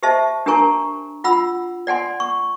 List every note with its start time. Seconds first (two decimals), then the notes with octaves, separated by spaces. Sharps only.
0.03 G4 C5 D#5 E5 A5
0.46 D4 G4 A#4 G#5 A#5 C#6
1.24 F4 F#5 B5 E6
1.87 D5 F#5 G#5 C6
2.20 C#6